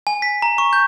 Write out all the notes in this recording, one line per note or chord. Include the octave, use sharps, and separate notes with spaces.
G#5
B6
A#5
C#6
G6